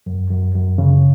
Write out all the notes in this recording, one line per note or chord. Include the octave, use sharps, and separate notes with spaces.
F#2
F#2
F#2
C#3